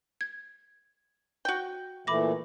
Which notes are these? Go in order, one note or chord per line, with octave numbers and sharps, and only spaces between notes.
G#6
F#4 G5
A#2 E3 A3 B5 D6 A#6